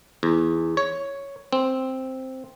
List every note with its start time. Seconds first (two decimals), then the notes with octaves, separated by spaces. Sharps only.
0.23 E2
0.77 C#5
1.53 C4